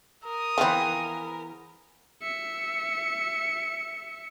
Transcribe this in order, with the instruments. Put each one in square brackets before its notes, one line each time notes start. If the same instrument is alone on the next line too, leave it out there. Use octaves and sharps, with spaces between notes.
[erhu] A#4 [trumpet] D#6
[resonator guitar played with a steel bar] E3 B3 G#4 [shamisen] F3 C4
[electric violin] E5 C#7